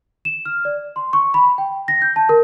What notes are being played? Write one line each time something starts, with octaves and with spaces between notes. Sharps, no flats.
E7
F6
D5
C6
C#6
B5
G5
A#6
G6
A5
A#4